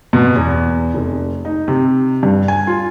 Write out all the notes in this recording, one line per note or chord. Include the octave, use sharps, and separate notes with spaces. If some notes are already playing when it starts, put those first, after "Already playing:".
B2
E2
F1
D#4
C3
G2
G#5
F4